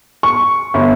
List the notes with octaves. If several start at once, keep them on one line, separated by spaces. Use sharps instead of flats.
C#6
G1